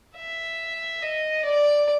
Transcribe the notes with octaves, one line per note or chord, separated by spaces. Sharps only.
E5
D#5
D5